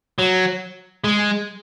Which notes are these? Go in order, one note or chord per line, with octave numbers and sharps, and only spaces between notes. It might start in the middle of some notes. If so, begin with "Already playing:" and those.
F#3
G#3